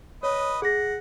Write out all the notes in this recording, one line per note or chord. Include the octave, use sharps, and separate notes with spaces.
B4 C#5 D#5
G#4 F#5 A#6